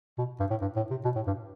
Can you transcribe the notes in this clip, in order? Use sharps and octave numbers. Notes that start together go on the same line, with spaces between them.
B2
G2
A2
G2
A2
C3
B2
A2
G2